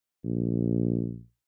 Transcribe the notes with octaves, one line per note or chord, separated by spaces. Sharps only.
A#1